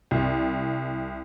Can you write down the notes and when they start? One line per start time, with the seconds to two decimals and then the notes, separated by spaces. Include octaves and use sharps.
0.11 C2